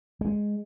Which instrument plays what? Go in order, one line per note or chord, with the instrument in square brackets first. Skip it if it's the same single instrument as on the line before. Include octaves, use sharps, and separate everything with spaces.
[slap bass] G#3